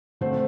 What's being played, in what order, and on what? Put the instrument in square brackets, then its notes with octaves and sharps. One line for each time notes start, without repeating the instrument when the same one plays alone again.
[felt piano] D3 A3 C4 C5